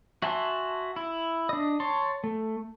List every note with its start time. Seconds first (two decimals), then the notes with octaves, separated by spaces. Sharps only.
0.22 F#4 E5 G#5 A5 C6
0.96 E4
1.49 D4 D#5
1.80 C#5 A5 C6
2.24 A3